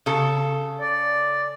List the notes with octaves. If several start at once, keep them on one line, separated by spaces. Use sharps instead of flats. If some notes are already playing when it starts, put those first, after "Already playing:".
C#3 A4
D5